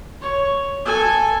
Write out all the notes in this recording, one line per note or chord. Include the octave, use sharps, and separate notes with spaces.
C#5
A4 G#5